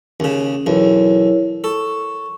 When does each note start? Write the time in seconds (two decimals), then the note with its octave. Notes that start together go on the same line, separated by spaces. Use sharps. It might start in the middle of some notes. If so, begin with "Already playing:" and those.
0.20 D#2 C#3 C#4
0.66 B1 E2 E4 A#4 C#5
1.64 A4 C#6